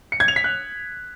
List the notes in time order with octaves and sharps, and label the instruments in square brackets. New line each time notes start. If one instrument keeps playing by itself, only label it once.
[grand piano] C#7
G#6
F7
B6
F#6